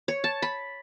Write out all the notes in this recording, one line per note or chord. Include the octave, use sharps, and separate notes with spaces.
C#5
A5
B5